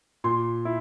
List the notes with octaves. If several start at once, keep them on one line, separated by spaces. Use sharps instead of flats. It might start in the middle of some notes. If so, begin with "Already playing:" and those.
A#2 C6
E4